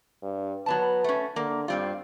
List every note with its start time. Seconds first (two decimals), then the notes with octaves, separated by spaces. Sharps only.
0.22 G2
0.66 F#3 B3 B4 A5
1.04 A3 C#4
1.36 D3 A#3
1.68 G2 G3 C4 F4